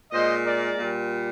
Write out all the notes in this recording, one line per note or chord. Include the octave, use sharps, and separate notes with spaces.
A#2 G#3 C5 D#5
A#4 D5
A#2
G3